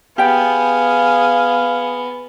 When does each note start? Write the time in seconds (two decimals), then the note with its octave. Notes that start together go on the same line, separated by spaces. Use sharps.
0.18 B3 G4 G#4 F5 G5